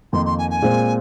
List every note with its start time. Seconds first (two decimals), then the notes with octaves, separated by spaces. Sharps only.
0.13 F2 D#3 A#3 D#4 C6
0.26 C6
0.38 G#5
0.50 G#5
0.62 A#2 G#3 C4